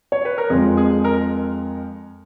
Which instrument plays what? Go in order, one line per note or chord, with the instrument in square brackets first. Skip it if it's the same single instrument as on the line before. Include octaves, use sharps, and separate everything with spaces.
[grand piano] C#5
B4
A#4
F2 F3 G#3 G#4
G#4
A#4